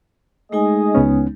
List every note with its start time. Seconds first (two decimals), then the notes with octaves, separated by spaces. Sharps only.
0.52 G#3 A3 D#4 G#4 D#5 G#5
0.95 C#2 B3 C#4